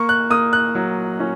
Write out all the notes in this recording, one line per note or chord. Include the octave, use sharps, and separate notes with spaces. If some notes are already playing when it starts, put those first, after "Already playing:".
Already playing: A#3 C#6
F#6
A#3 D#6
F#6
F#3
C#4